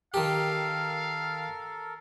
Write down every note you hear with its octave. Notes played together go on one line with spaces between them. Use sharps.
D#3 G4 A4 A#4 F5